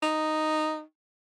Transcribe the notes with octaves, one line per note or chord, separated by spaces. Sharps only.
D#4